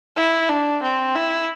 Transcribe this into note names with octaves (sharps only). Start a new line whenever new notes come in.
E4
D4
C4
E4